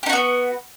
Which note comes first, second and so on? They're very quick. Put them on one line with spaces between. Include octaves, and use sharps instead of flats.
G4 D#4 F#4 B3